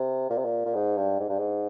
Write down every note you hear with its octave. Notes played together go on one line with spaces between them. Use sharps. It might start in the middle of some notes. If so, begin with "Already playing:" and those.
Already playing: C3
A#2
C3
A#2
A#2
G#2
G2
G#2
G2
G#2